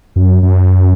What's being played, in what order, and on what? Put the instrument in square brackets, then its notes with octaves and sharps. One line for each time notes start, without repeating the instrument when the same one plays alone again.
[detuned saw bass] F#2
F#2